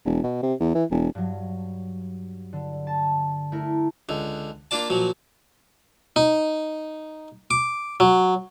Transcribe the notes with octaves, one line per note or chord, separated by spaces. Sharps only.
E1
B2
C3
E2
E3
E1
G2 F#3
D3
A5
A3 E4 A#4
C#2 D3
A#3 D4 F4 D5 A5
A#2 F3 F#3
D#4
D6
F#3